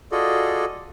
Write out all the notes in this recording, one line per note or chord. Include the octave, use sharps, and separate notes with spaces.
F4 F#4 G#4 A4 D5 D#5